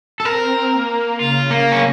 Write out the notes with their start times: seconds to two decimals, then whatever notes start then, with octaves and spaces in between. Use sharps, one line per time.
0.20 A4
0.24 C4 A#4
0.72 A#3
1.19 C#3 F4
1.51 A#3
1.72 C#4